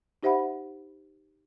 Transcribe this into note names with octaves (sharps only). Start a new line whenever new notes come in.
D#4 G4 C5 E5 F#5 B5